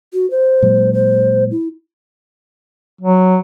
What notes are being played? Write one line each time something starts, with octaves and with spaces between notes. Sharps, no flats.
F#4
C5
A#2 F#3 G#3
C5
E4
F#3